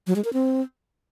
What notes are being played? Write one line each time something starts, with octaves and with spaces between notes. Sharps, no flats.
F#3
G#3
A#4
C4